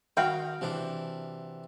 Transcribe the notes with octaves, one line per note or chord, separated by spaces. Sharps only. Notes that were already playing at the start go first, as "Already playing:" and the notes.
D#3 F#4 F5 G5
C3 E3 D4